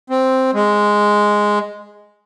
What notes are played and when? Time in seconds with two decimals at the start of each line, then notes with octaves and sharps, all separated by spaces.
0.10 C4
0.54 G#3